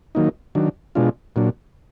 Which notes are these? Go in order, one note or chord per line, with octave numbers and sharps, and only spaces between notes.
D#3 F#3 A#3 D#4
D#3 F#3 D4
B2 G#3 D4 F4
A#2 F#3 D4